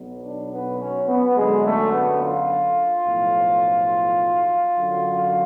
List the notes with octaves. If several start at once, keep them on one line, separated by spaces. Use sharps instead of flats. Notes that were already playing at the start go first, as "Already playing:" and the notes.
Already playing: B1 B2 F#3
D4
B3
C#4
B3
F#2 D3 F#3 G#3
A3
B3
F4
B1 A2 F3
F#2 D3 F#3